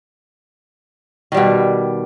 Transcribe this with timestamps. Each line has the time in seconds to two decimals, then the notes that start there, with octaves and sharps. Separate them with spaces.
1.32 D#3
1.34 G3
1.37 B2